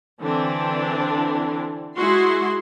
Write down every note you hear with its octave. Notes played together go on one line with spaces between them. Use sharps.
D3 E3 C4 D4
G#3 E4 F#4 C6